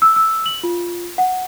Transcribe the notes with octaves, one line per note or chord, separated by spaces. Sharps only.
E6
E6
F#7
F4
F#5